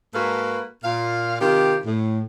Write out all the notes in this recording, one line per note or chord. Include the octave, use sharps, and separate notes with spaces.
G#2 A#3 F#4 A4 B4 F5
A#2 F4 F5
C3 D#3 F4 G4
A2